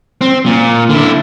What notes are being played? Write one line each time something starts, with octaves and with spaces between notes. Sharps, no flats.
C4
A#2
D3 E4